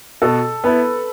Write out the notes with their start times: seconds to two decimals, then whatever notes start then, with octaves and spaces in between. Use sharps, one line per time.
0.22 B2 A4
0.64 B3 E4 B4